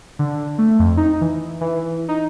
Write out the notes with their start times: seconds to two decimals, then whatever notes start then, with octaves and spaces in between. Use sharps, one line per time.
0.19 D3
0.58 A3
0.79 F2
0.97 D#4
1.21 E3
1.61 E3
2.08 D#4